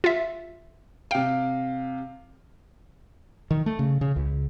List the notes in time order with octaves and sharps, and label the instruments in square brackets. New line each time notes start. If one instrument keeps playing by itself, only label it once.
[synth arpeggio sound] F4 E5
[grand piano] C3 F5 [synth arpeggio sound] G5
[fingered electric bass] D#3
A3
C#3
C#3
C#2